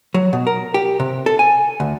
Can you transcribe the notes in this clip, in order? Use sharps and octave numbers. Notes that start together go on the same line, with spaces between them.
F#3
B2
A#4
G4
C3
A4
G#5
D2